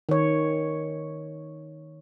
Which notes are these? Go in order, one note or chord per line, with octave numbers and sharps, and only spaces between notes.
D#3 C#5